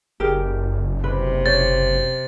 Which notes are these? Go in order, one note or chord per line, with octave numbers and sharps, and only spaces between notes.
F#1 G4 G#4 A#4
C3 B4
C5 C#5 A6